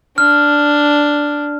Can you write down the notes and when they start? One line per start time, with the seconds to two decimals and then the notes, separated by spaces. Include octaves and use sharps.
0.18 D4 F6